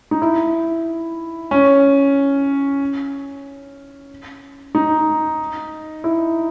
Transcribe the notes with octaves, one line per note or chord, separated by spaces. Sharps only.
D#4
E4
C#4
D#4
E4